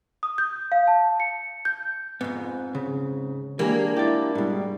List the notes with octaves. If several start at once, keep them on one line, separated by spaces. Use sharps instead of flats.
D#6
G6
F5
A5
C#7
G6
F2 G#2 B3
C#3
E3 G#3 A#3 D4 G4
E4 G4 D5
G#2 B2 G3